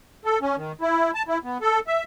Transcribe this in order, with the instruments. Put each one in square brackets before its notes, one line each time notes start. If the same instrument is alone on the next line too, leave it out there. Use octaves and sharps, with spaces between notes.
[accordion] A4
C#4
D#3
E4
A5
E4
B3
A4
E5